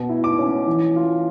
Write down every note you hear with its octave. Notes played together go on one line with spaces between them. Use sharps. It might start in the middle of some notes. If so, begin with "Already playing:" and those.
Already playing: B2
E4
D6
C#4
E3
F4